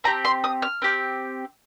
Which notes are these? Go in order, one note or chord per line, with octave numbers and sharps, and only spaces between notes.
C4 G4 A#5
C6
D#6
F6
C4 G4